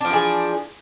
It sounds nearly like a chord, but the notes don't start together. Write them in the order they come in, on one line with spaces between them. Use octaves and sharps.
D4 F3 E3 G#4